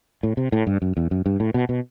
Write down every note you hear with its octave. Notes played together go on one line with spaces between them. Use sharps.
A2
C3
A2
G2
F#2
E2
F#2
G2
A2
B2
B2